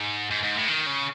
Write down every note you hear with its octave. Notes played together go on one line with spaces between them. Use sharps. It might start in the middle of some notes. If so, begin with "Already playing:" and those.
Already playing: G#2
G#2
G#2
A2
D#3
C#3